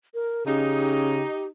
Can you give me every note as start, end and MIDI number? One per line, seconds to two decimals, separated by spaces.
0.14 0.46 70
0.47 1.22 49
0.47 1.46 63
0.47 1.46 67